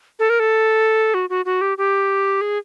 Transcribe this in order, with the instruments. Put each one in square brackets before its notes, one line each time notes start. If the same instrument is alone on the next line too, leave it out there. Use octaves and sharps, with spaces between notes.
[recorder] A4
A#4
A4
F#4
F#4
F#4
G4
G4
G#4